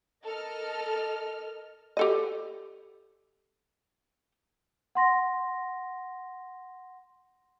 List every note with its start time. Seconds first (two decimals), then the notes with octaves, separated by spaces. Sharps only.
0.24 A4 A#4 D#5 F6
1.97 G4 A4 D#5
4.95 F#5 C6 A#6